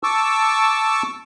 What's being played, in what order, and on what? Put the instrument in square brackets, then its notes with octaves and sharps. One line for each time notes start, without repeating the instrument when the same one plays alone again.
[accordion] A5 C#6 D6 E6